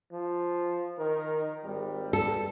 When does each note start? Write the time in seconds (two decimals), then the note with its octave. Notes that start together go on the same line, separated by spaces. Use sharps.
0.12 F3
0.99 D#3 A#4
1.64 G#1 G3
2.13 A4